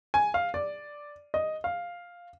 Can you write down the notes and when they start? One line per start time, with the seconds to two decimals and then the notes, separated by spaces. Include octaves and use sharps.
0.14 G#5
0.34 F5
0.54 D5
1.34 D#5
1.64 F5